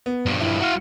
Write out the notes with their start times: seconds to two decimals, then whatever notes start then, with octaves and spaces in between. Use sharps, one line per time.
0.06 B3
0.26 G2 F3
0.40 E4
0.61 F#4 F5